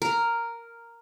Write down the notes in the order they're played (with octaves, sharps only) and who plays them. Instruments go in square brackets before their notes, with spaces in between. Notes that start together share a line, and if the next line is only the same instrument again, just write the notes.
[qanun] A#4